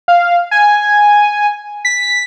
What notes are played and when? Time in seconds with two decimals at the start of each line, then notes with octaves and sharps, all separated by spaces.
0.08 F5
0.51 G#5
1.85 B6